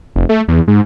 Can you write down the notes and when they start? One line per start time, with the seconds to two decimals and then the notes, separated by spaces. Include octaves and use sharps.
0.16 F1
0.29 A3
0.48 E2
0.68 G#2